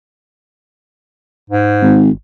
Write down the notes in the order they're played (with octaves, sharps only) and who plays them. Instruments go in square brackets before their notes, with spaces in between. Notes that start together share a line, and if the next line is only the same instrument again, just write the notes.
[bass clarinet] G#2
[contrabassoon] G#1